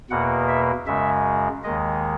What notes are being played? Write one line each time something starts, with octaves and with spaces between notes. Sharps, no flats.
E2 B2 A#3 F#5
E5
F#2 C#3 G#3 E5
D#2 D#3 G#3 D#5